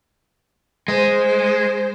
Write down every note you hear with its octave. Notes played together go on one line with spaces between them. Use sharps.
G#3 C5